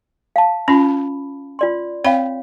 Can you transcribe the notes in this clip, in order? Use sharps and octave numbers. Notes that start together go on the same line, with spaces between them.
F5 A5
C#4 F4 B5
F4 D5 C6
C4 C#5 F5 G5 B5